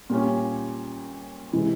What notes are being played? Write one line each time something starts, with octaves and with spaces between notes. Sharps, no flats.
A#2 G3 C#4 F4
C3 E3 G#3 E4